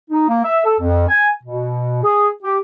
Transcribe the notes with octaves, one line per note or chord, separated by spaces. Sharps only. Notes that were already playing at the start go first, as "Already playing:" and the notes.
D#4
A#3
E5
A4
F2
G#5
B2
G#4
G4